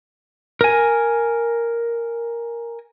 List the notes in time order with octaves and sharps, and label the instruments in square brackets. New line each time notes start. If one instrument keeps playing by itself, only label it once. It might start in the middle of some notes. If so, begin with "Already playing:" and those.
[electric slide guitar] A#4 G#5